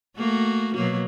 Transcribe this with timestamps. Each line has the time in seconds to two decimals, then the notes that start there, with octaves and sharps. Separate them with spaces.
0.17 A3 A#3 F#4
0.75 B2 F#3 A#3